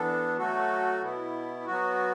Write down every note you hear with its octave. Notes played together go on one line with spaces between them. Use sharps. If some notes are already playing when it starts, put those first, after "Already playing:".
Already playing: E3 B3 D4 A4
F#3 A3 F#4 A4
B2 B3 E4
F#3 B3 F#4